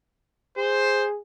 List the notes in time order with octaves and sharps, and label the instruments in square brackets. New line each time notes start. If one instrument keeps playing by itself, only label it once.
[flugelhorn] G#4 [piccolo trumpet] C5